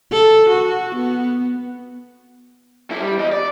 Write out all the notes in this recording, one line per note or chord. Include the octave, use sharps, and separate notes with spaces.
A4
F#4
B3
F#2 E4
G3
E2 D#5
D5